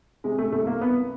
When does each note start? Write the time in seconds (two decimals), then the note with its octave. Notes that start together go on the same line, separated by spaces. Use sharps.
0.24 C3 G#3
0.38 A3
0.52 C2 A3
0.67 A#3
0.81 C2 B3